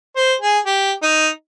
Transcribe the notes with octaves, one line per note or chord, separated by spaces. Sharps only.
C5
G#4
G4
D#4